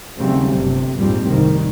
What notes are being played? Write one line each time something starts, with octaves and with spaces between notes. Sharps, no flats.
D#2 C#3 F#3 G3 A3 C4
G1 C3
A#1 F2 G#2 G3 A#3 C4
F1 C2 G#2 D#3 G3